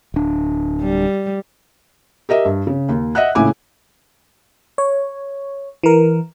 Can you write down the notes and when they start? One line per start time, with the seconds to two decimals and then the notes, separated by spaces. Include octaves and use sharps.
0.14 D1 D4
0.81 G3
2.29 G4 A#4 D#5 E5
2.45 G2
2.67 C#3
2.89 D#2
3.15 D#5 E5 F#5 F#6
3.35 A#1 A2 C#3 E4 G#5 D6
4.78 C#5
5.83 E3 A#4